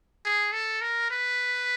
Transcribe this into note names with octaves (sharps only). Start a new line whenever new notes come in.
G#4
A4
A#4
B4